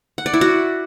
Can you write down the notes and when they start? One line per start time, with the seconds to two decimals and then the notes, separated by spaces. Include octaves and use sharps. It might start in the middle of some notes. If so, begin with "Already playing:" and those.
0.18 F#5
0.26 D5
0.34 E4
0.41 F#4